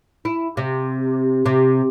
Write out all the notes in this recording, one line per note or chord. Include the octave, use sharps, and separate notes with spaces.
E4
C3
C3